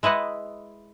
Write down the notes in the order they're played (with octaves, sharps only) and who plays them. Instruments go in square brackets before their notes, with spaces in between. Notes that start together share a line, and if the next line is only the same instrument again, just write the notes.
[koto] G#3 E4 B4 D#5 F#5